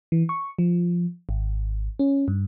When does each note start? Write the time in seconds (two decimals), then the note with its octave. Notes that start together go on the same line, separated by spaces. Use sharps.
0.12 E3
0.29 C#6
0.59 F3
1.29 G#1
1.99 C#4
2.28 G2